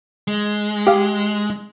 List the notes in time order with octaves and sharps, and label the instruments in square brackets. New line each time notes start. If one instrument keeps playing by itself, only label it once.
[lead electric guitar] G#3
[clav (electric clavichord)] G4 F5